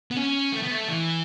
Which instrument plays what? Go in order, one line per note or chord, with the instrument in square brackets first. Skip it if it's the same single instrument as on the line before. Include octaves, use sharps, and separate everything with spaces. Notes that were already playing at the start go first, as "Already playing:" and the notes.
[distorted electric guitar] B3
C#4
A3
B3
A3
E3